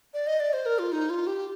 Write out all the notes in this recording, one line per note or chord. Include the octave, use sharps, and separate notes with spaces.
D5
D#5
D5
C5
A#4
F4
D#4
F4
G4